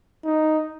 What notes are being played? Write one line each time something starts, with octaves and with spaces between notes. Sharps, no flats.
D#4